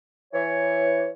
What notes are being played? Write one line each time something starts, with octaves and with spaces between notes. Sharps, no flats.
E3 C#5